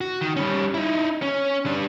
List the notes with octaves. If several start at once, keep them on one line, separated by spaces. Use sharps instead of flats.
F#4
D#3
G3 C#4
D#4 E4
C#4
G3 D4